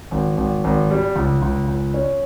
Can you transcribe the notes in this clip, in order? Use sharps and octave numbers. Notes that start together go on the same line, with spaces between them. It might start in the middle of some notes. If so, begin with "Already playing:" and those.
G#1
G#1
G#1
G3
C#2
C#2
C#2
C#4